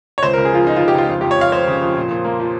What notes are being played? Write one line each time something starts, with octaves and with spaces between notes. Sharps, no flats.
C#5
C#2 C5
A#4
C#2
G#4
F3 F4
F3 D#4
F4
C#2
G4
C#2 F4
F2 F4
F2 G4
C#5
F2 F5
F2 C5
C#3
F2
A#2
A#2
A#3
F3